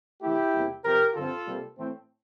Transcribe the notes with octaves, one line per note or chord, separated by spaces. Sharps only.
C3 E3 A3 E4 G4
E2 C3 G3 A#3
C3 F3 C4 G4 A#4
G2 D3 F3 C4 F4 A4
C3 G3 A#3
A2 E3 A3 C4